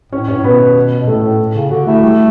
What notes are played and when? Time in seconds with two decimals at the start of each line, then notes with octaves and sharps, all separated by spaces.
0.12 A2 C#4 C#5
0.28 G2 C#4 C#5
0.36 A2
0.44 B2 B3 B4
0.99 B2
1.07 A2 A3 A4
1.24 A2
1.39 A2
1.55 C#3
1.71 D3 F#4
1.87 A3 E4
2.03 G3 G4